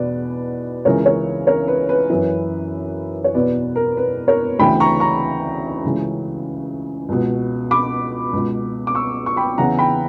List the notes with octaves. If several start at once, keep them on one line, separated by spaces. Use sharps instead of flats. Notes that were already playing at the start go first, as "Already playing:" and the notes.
Already playing: E2 B2 B4 D5
C#2 C#3 E3 A#4 C#5
A#4 C#5
A#4 C#5
B4
B4
F#2 E3 B4
C#5
E2 B2 B4 D5
A#4
B4
A#4 C#5
D2 C#3 E3 G5 B5
A#5 C#6
A#5 C#6
C#2 C#3 E3
C#2 B2
B5 D6
C#2 B2
D6
C#6 E6
C#6
G5 B5
E2 C#3 E3 F#5 A#5
G5 B5